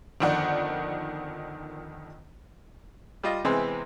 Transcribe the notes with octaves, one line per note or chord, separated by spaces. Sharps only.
G1 F2 D#3 D5 F#5
G3 F4 D#5
C3 E3 G#3 B3 C4